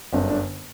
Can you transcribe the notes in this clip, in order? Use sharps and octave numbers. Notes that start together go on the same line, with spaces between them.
G1 F#2 D3 C4
D4